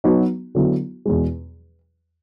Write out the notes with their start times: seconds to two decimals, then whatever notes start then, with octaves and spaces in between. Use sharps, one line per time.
0.04 F#3 B3 D#4 F#4 B4
0.55 D3 F#3 B3 E4
1.06 E2 B2 G#3